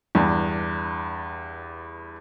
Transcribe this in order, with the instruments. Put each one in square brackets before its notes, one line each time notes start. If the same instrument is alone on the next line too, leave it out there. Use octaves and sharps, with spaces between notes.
[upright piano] E2 G2 D4